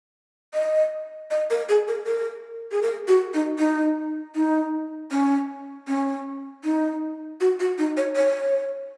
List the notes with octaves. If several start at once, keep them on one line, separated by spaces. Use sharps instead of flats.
D#5
D#5
A#4
G#4
A#4
A#4
G#4
A#4
F#4
D#4
D#4
D#4
C#4
C#4
D#4
F#4
F#4
D#4
C#5
C#5